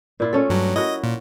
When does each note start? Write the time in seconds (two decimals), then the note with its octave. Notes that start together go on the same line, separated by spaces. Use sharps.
0.20 A#2 E4 F4
0.33 A3 C#4 A4
0.50 G2 F#3
0.76 E4 F#4 A#4 D#5
1.03 A#2